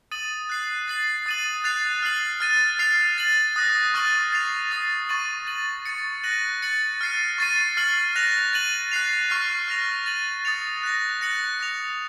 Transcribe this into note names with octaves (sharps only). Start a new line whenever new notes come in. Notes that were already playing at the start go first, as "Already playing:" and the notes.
D#6 A6 D#7 F#7
F#6 C7 F#7
A6 C7 F#7
D#6 A6 D#7 F#7
F#6 A6 C7 F7
F6 C7 F#7
F6 A6 D#7
F6 C7 F7
A6 D#7 F#7
D#6 F#6 A#6
C#6 F6 A6 D#7 F#7
A6 C7 F7
D#6 A6 C7
C#6 A6 D#7 F#7
A6 D#7 F#7
C#6 A6 C#7
F#6 A#6 D#7 F#7
A6 C#7 F#7
F6 A6 C7 D#7
C#6 A6 C7 D#7
F6 C7 F#7
F#6 A#6 F7
A6 D#7 F#7
F#6 A6 C7 F7
C#6 F6 C7
F6 A#6 F7
A6 D#7 F#7
D#6 A6 C#7 F7
F#6 A#6 F7
F#6 A#6 C#7 F#7
D#6 A#6 F7